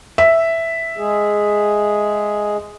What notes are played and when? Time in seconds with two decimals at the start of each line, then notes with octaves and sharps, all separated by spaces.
0.18 E5
0.97 G#3 G#4